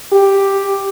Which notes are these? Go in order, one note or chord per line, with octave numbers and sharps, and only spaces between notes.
G4